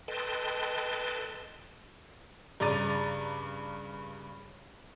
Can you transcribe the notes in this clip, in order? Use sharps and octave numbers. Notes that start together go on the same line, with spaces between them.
A4 B4 D#5 G5 A5 C6
G2 C#3 A#5 D6 A6 D#7